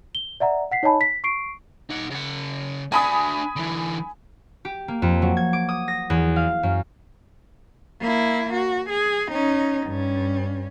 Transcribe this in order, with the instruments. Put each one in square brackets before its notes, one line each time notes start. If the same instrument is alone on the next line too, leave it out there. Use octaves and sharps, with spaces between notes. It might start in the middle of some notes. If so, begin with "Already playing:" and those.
[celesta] G7
D5 E5 F#5 A#5
F#5 B6 C7
D#4 C#5 D#5 G#5 A5 B5
B6
C#6 C7 D7
[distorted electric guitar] D#4 F#5
C#3 F#5
[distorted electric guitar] D4 F#4 [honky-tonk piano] G#5 B5 D#6
[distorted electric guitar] D3 E3
[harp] G4
A#3
F2
F#3
G#6
D6
D#6
A#6
E2
F5
F#2
[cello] A#3 E4
F#4
G#4
C#4 D#4
G2 C#4